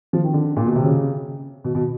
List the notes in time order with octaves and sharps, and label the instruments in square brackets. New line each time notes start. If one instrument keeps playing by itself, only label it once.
[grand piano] F3
D#3
D3
A#2
B2
C3
C#3
B2
B2